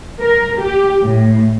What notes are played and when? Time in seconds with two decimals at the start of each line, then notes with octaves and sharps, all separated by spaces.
0.21 A#4
0.60 G4
1.04 A2